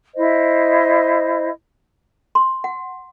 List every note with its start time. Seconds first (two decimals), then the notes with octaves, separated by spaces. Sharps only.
0.14 E4 C5 D#5
2.35 C6
2.64 F#5